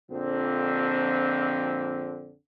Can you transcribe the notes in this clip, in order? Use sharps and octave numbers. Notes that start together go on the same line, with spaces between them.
A#1 F2 D3 C4